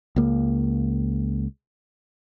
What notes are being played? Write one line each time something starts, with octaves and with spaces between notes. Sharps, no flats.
C#2 A#3